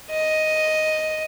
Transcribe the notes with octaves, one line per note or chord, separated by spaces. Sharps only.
D#5